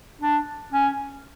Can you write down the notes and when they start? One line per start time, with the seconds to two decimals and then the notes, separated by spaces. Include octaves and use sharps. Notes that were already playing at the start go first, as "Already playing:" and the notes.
0.21 D4
0.73 C#4